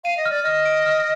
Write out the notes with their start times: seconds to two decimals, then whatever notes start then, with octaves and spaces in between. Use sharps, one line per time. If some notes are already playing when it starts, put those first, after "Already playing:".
0.04 F5 D#7
0.17 D#5
0.26 D5 F6
0.43 D#5 F6
0.66 D7
0.86 F6